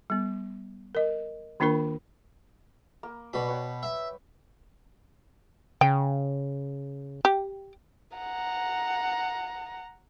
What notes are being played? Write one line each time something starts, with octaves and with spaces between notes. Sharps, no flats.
G3 B3
A#4 D#5
D#3 A#3 D4 F4 A#4 B5
A#3
B2 F#4 B4 D5 B5
C#5 F#5 G5
E5
C#3 G5
G4
F#5 A#5